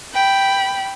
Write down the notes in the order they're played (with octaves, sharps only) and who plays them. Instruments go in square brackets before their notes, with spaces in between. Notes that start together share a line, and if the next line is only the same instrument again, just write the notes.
[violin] G5 B5